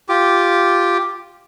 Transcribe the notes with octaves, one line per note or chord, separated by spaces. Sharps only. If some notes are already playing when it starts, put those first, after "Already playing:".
F4 G4 D6